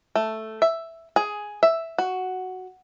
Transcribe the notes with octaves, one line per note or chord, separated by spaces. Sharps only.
A3
E5
G#4
E5
F#4